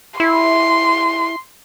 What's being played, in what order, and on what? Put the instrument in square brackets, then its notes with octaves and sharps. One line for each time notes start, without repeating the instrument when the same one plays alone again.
[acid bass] E4 [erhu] C6